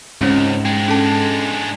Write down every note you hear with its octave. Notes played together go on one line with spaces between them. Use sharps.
C#2 G#2 C4 C#4 C5
G#3 D4 G5
C#4 A4 A5